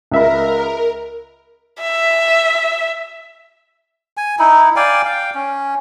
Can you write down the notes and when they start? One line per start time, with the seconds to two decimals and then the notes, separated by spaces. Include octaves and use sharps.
0.11 C#2 A#4 E5 B5
1.81 E5
4.17 G#5
4.39 D#4 E4
4.76 D5 F5 G5 G#5
5.05 F5 G5
5.35 C#4